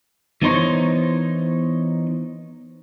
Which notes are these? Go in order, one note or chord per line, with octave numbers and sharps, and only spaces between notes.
E3 B3 D#4 C5 C#5